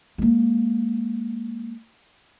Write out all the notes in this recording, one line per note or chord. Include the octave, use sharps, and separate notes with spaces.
G#3 A#3